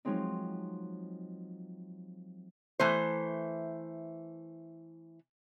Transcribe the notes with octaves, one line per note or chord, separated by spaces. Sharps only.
F3 F#3 G#3 C4 D#4
E3 A3 C5